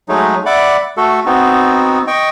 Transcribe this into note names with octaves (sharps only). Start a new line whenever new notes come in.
F#3 G#3 A3 D#4
D5 E5 F#5 B5 D6
A3 F#4 A4
B3 C4 D#4 F#4
D#5 G5 C#6